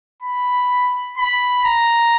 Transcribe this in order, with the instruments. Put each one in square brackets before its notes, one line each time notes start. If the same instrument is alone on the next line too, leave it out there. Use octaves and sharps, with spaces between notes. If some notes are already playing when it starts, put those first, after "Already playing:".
[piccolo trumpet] B5
B5
A#5